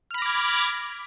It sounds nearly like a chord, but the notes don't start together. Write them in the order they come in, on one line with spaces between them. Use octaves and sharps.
F6 B5 A#6 D6 G#6